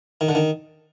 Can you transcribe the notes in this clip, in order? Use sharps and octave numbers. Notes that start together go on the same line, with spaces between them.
D#3
D3
D#3